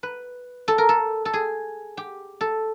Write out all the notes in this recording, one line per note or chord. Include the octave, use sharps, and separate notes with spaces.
B4
A4
A#4
A4
A4
G#4
G4
A4